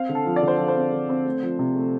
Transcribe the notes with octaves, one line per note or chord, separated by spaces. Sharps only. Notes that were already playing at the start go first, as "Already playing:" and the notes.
Already playing: C4 F5
D3
A4
F3
D5
D3
C5
F3 A4
C5
C4
D3
C4
A3
F3
C3
A3